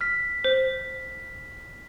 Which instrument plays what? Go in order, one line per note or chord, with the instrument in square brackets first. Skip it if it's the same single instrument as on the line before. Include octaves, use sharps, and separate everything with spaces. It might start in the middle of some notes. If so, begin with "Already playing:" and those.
[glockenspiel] F6 B6
[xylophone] C5